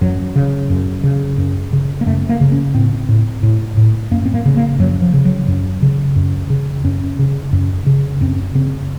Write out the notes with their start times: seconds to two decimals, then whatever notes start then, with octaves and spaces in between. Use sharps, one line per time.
0.01 F#2 F#3
0.36 C#3
0.70 F#2
1.04 C#3
1.38 F#2
1.73 C#3
2.01 A#3
2.06 F#2 A3
2.29 A#3
2.41 C#3
2.52 C#4
2.75 A2 C4
3.09 A2
3.43 A2
3.77 A2
4.11 F#2 A#3
4.26 C4
4.34 A#3
4.46 C#3
4.57 A#3
4.79 F#2 F#3
5.02 F3
5.14 C#3
5.25 F#3
5.48 F#2
5.82 C#3
6.16 F#2
6.50 C#3
6.84 F#2 C#4
7.19 C#3
7.53 F#2
7.87 C#3
8.21 F#2 C4
8.55 C#3 C4